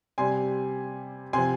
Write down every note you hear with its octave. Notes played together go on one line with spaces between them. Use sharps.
C3 G3 G#5 C6
C3 F3 G#5 C6